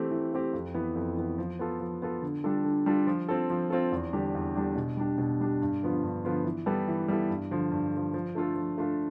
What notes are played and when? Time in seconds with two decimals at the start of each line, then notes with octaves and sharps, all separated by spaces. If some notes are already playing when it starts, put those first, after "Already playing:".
Already playing: E3 A3 C4 G4
0.11 E3
0.33 A3 C4 G4
0.53 F2
0.74 E3 B3
0.96 F2
1.17 E3 B3
1.38 F3
1.59 B3 F4 A4
1.80 F3
2.02 B3 F4 A4
2.22 D3
2.44 G3 D4 F4 A4
2.65 D3
2.86 G3 D4 F4 A4
3.07 F3
3.28 C4 F4 A4
3.50 F3
3.70 C4 F4 A4
3.92 E2
4.13 D3 G3 D4 G4
4.35 E2
4.55 D3 G3 D4 G4
4.76 B2
4.97 G3 D4 G4
5.18 B2
5.40 G3 D4 G4
5.61 G2
5.82 D3 F3 B3 F4
6.03 G2
6.25 D3 F3 B3 F4
6.45 E3
6.66 G3 B3 E4 A4
6.88 E3
7.08 G3 B3 E4 A4
7.30 G2
7.51 D3 F3
7.72 G2
7.93 D3 F3
8.14 F3
8.35 A3 D4 F4 A4
8.56 F3
8.78 A3 D4 F4 A4